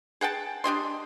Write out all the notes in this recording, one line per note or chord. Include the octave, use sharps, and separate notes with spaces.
G#4 F#5 G5 A5
D4 G4 D#5 C6